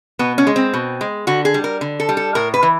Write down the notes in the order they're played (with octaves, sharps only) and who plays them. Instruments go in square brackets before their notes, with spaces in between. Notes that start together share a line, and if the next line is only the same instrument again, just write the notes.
[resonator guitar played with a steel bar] B2 B3
C#4
G#3
C4
B2
G#3
D3 F#4
G#4
G3
A#4
D3
A4
G3
A4
A2 A#4
B4
E3